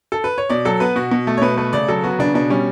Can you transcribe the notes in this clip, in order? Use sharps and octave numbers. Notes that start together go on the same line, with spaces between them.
A4
B4
C#5
B2 D5
F#3 A4
B3 B4
B2 F#4
B2
A3
C#5
B2 B4
A3 B4
C#3 D5
F#3 A4
B3 F#4
C#3 D4
B2 D4
G3 C#4